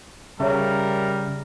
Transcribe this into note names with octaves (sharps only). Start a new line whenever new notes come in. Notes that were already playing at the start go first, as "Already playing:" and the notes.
C#3 G3 A#4 C#5 E5